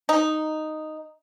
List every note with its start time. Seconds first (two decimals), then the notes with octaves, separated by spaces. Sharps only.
0.09 D#4